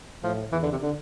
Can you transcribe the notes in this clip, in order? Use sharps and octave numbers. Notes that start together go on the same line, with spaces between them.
A2 F3
E2 E3
D3
C3
D3